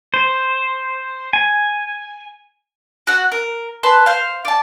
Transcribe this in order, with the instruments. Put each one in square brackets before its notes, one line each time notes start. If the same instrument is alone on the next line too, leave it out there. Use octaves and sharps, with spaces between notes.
[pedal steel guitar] C5
G#5
[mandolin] F#4 F#5
A#4
B4 A5 C6
C5 F5
D5 A5